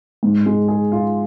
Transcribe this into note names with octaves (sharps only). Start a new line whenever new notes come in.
G#2
G#3
G#4
F4